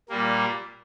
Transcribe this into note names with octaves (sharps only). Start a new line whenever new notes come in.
A#2 G3 A#3